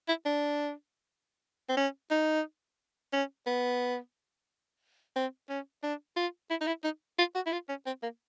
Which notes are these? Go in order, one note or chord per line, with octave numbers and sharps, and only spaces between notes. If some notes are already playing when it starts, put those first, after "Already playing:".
E4
D4
C4
C#4
D#4
C#4
B3
C4
C#4
D4
F4
E4
D#4
E4
D#4
F4
F#4
E4
F4
C#4
C4
A#3